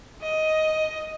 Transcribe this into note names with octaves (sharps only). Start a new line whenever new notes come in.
D#5